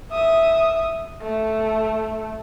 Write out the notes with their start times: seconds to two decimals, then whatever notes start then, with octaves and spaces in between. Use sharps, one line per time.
0.11 E5 D#6
1.22 A3